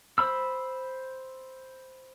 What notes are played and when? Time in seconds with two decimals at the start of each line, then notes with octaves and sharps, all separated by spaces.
0.18 C5 B5 E6